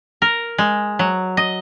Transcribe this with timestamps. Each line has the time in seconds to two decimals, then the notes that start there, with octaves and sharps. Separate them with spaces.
0.22 A#4
0.58 G#3
0.99 F#3
1.37 D#5